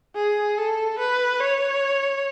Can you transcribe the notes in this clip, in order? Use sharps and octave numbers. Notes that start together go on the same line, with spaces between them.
G#4
A4
B4
C#5